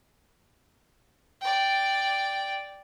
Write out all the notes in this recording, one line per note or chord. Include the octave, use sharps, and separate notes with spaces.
D5 G5